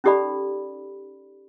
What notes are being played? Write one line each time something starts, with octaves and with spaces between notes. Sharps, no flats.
C#4 D#4 G4 A4 D5 B5